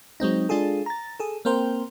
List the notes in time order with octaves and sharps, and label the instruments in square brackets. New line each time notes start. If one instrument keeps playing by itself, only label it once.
[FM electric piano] F#3 G#3 C4 D#4
G#3 D4 F4 G#4 A4
A#5 A6
G#4 A4
A#3 C4 A#4 C5 G5